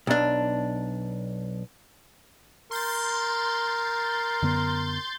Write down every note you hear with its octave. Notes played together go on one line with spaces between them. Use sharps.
B1 D4
A#4 C6 G6 A6
F#2 D3 B3